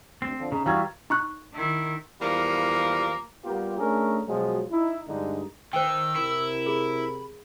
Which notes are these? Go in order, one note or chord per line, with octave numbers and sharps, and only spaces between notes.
D2 C4
D3 F3
C#3 D#4
E3 G3 F#4 F5 G5 A#5 G#6
D#4 C#6 F#6
D#3 E4
E2 F3 G3 A#3
G3 A#3 B3 F4 G4
A3 C#4 D4 G#4 A#4
B2 F3 F#3 G#3
D#4 E4
G2 D3 G#3 D#4
D#3 C5 G5 E6
C3 E4 A#4
G#4 B5